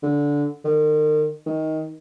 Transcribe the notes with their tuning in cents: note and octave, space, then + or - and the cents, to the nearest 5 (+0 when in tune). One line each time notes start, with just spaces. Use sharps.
D3 -15
D#3 -40
D#3 +15